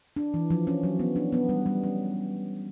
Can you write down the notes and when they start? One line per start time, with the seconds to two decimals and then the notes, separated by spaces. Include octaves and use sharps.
0.16 D4
0.34 E3
0.50 F3
0.67 C#4
0.83 F#3
0.99 B3
1.16 D4
1.32 B3
1.49 G3
1.66 G3
1.83 C#4